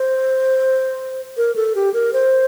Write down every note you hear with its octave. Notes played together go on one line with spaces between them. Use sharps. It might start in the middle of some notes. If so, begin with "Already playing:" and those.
Already playing: C5
A#4
A4
G4
A#4
C5